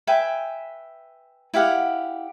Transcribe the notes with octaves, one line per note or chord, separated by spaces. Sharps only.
B4 E5 G5 G#5
E4 G4 F5 F#5